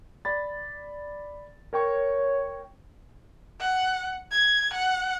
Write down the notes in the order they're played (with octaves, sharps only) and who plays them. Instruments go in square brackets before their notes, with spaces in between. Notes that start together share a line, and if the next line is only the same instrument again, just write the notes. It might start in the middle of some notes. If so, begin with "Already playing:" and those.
[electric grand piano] D5 B5 A6
[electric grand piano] A#4 G5 C#6 [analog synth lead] C#5
[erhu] F#5
G#6
F#5